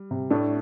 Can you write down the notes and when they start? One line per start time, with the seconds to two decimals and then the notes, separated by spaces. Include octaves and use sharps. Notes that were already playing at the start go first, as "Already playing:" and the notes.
Already playing: G3
0.11 C3
0.30 A2 A3 D4